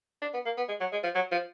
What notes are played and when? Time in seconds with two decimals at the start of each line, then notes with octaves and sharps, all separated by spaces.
0.22 D4
0.34 B3
0.45 A#3
0.58 B3
0.68 G#3
0.81 F#3
0.92 G#3
1.03 F3
1.15 F#3
1.32 F3